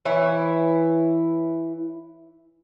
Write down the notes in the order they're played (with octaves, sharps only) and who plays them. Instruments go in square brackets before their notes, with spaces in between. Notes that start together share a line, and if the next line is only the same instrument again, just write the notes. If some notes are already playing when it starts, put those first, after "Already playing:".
[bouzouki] E3 E4 C#5